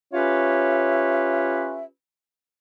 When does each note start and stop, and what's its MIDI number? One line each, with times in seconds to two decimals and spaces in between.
0.13 1.84 61
0.13 1.84 65
0.13 1.84 67
0.13 1.84 71
0.13 1.84 73
0.13 1.84 76